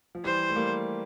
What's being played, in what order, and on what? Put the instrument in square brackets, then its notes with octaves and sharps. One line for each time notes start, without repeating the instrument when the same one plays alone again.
[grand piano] F3
[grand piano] E3 G3 [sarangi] C5
[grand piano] A3
G3 A#3